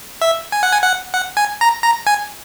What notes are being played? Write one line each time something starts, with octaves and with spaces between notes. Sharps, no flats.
E5
G#5
F#5
G#5
F#5
F#5
G#5
A#5
A#5
G#5